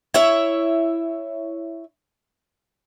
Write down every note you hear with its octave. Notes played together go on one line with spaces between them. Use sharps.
E4 C#5 E5